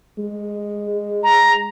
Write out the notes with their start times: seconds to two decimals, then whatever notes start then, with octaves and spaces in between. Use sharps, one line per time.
0.18 G#3
1.23 A#5